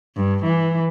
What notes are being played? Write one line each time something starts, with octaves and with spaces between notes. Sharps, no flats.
G2
E3